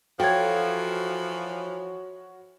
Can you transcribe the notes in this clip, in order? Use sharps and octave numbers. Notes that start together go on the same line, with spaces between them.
E3 F3 F#4 A4 C#5 G5 G#6